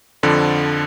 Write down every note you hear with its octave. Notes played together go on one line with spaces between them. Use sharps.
F2 D3 F3 D5